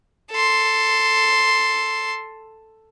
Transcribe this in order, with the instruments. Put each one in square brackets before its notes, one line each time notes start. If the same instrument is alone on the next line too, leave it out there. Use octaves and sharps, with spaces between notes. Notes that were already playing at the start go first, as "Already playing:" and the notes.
[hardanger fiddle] A4 C6